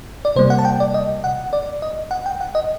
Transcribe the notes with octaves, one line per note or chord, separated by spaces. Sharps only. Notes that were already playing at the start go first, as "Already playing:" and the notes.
D5
C3 G3 A#3 C5
F#5
A5
G5
D5
D#5
F#5
D5
D#5
F#5
G5
F#5
D#5